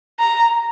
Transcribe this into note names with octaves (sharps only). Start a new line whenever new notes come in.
A#5